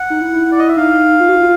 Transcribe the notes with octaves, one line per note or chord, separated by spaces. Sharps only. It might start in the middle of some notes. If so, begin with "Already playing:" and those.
Already playing: F#5
D#4
E4
E4
D5
D#5
E5
D#4 F5
F4
F#4
F4